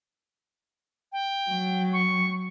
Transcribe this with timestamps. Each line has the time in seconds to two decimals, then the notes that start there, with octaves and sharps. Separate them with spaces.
1.12 G5
1.50 F#3
1.93 C#6